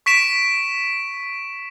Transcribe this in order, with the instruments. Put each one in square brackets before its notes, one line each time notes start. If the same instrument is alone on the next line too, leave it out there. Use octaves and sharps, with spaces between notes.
[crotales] C#6 B6 D7 E7